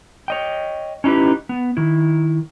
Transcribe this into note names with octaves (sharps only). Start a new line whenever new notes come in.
C#5 D#5 G5
C#4 D#4 E4 G4 B4
B3
D#3 E4